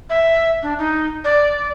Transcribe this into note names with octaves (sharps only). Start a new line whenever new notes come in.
E5
D4
D#4
D5